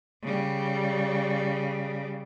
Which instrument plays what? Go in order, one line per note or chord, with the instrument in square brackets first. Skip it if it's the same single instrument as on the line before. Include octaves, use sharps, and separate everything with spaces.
[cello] C#3 G3